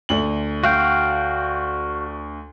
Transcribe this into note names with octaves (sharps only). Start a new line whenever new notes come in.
D2 F#7
F#4 F5 G5